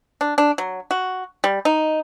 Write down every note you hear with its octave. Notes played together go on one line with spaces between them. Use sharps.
D4
D4
F#3
F#4
G3
D#4